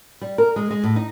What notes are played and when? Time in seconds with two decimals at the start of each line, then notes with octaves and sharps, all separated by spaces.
0.21 G3
0.38 A#4
0.56 G#3
0.70 G#3
0.83 A2
0.96 D#4